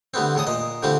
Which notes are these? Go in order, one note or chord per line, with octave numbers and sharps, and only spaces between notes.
D3 G3 A3 B3 C4
E2 A2 A4 D#6
A#2 D#5
D3 F3 G3 A3 C4